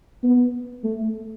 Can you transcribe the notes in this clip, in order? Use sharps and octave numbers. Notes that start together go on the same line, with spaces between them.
B3
A3